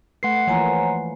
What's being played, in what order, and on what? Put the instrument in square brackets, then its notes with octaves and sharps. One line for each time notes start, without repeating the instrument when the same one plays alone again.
[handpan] A3 B4 [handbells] F#5 C6 C7
[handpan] E3 F3 A#3 [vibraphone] C#5 G#5 A#5